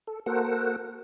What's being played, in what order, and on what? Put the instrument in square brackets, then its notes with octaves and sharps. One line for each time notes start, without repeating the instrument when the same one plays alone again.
[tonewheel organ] A4
A#3 F#4 A4 A#4 C5 F#5